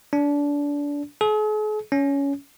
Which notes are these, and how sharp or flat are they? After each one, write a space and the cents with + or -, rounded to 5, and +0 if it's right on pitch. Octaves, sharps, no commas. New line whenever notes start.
D4 -25
G#4 +45
C#4 +15